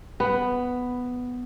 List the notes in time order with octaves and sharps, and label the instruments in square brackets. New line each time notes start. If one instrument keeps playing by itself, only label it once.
[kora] B3